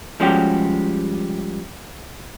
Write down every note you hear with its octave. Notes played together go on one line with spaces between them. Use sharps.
F3 G3 G#3 C#4 F#4 G4